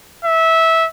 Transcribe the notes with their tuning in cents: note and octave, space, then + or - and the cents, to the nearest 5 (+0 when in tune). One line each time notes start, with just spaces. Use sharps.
E5 -15